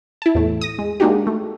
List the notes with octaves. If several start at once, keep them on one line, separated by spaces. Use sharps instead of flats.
E4 A5
E2 A2 A3
D#6 A#6
G#3
G#3 A#3 D4 D#4 F#4 G4
A3